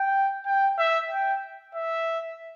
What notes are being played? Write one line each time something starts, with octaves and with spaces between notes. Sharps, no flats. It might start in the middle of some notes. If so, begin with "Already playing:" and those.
Already playing: G5
G5
E5
G5
E5